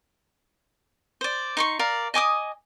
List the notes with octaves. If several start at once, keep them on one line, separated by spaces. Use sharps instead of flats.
C5 D5
D#4 C6 C#6
A#4 D5 F5
D#5 G#5 D6 D#6